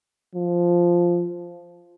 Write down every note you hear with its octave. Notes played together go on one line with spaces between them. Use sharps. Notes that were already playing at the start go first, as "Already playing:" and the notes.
F3